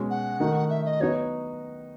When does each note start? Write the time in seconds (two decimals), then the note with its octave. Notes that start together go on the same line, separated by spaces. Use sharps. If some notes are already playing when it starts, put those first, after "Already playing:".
Already playing: B2 G#3 C#4 F#4
0.10 F#5
0.40 D#3 A3 D#4 F#4
0.70 E5
0.85 D#5
1.00 F#3 B3 D#4 F#4 C#5